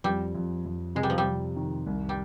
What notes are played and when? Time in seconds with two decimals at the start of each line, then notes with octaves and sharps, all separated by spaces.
0.04 F2 G3
0.35 F2
0.66 F2
0.95 C3 G#3
1.03 G3
1.10 F3
1.18 G3
1.25 F2
1.56 D#3
1.86 C2
2.09 G3